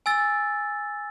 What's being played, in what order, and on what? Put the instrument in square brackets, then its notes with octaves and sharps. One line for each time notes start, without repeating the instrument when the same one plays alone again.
[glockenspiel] G#5 E6 A6